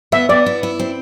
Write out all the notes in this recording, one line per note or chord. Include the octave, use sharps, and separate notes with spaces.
B3 E5
B3 D5
E4
E4
C4